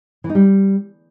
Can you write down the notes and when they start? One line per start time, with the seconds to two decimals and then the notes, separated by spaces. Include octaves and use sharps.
0.24 E3
0.29 D#4
0.35 G3